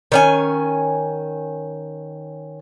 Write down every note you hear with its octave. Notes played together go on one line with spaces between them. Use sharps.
D#3 C#4 G#5